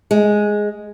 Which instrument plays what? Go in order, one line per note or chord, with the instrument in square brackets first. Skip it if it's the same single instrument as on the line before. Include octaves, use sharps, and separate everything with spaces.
[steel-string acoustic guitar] G#3